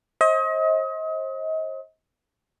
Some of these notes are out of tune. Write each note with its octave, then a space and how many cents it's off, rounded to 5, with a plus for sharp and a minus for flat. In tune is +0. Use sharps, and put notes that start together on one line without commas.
C5 +40 D#5 +35